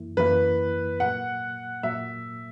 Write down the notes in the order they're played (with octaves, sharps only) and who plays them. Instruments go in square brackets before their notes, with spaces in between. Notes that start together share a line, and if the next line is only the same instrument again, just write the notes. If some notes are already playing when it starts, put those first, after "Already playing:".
Already playing: [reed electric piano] F#2 E3 A#3 E4
[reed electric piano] F#2 E3 A#3 E4 [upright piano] B4
[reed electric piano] A#2 F#3 A#3 [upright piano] F#5
[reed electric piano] A#2 F#3 A#3 [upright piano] E5